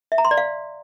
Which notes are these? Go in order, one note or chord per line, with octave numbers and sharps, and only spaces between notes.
E5
A#5
C6
D5
F5